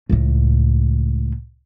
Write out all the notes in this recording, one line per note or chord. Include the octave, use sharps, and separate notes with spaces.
C#2 A2